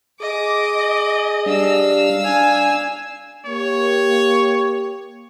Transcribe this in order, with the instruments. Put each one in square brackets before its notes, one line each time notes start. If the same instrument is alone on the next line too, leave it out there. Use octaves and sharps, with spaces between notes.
[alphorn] G#4 [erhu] D#5 [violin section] D6
[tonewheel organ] G3 D4 [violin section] F5 E6
[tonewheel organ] D4 [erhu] G#5
[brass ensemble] A#3 G4 [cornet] C#5